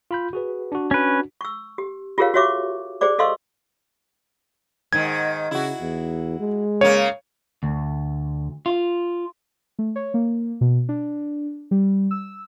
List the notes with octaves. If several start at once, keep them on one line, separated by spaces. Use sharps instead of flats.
F4 B5 G6
F#4 G#4 B4
D4 F#4
C#4 B4
C#6 E6
G4
F4 G4 G#4 A#4 C#5 F5
F#4 G4 C#5 E5 C#6 D6
G4 G#4 C5 D5 D6
A4 D#5 F5 C6 C#6 E6
G#2 D#3 G#6
C#3 E4 F#4
E2
G#3
C#3 A#3 C#5
D2
F4
A3
C#5
A#3
B2
D4
G3
E6